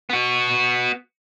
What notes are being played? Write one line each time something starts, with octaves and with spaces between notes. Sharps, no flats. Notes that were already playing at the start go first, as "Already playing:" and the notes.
B3 F#4